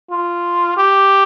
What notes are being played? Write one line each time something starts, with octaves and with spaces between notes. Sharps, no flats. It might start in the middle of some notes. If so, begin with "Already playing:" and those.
F4
G4